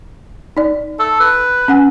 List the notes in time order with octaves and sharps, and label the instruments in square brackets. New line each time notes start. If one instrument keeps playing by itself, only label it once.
[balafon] D#4 D5
[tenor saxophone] A4
B4
[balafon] C#4 F#5 G#5